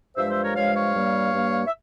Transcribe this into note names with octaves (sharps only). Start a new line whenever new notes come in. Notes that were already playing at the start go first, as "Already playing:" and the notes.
G2 F3 G#3 C5 E5
C5 E5
A#4 C#5
G2 F3 G#3 C#5 F5
C#5 F5
G2 G3 A#3
G2 G3 A#3
E5